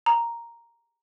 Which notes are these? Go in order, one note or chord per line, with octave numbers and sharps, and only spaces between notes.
A#5